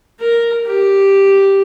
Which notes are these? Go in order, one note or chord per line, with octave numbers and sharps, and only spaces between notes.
A#4
G4